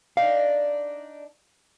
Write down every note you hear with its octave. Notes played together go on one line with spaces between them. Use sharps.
D4 D#4 F5